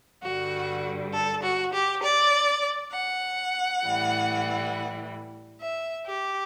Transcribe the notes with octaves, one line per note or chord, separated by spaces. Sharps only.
G2 D3 G3 F#4
A4
F#4
G4
D5
F#5
A2 E3 G3
E5
G4